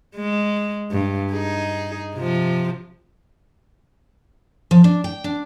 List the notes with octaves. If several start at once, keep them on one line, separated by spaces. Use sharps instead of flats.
G#3
G2
D#4 G#4
C3 F3
F3
D4
G5
D4